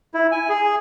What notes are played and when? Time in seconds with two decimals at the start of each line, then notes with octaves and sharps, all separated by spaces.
0.14 E4
0.32 G#5
0.49 G#4